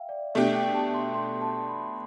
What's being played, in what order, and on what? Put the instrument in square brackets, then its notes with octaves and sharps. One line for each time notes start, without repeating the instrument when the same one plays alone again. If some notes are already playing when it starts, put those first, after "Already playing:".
Already playing: [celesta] E5 F5 G5
D5
[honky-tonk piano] B2 A3 D4 G4 [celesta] E5
[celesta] G5
A5
C6
C6
A5
B5